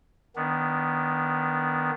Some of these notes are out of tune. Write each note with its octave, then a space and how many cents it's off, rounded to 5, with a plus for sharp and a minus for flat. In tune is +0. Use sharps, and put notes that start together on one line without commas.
D#3 +0 B3 +0 D4 -25